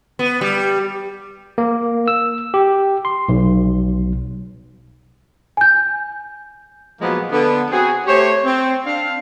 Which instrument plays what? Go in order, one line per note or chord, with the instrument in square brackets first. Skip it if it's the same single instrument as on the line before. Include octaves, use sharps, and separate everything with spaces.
[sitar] B3
G3
[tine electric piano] A#3
E6
G4
C6
B1
[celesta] G#5 G6
[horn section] A#2 F3 F#3 G#3 A#3 B3
D3 B3
C4 F#4 G#4
A3 G4 C5 C#5
C4
D4 F5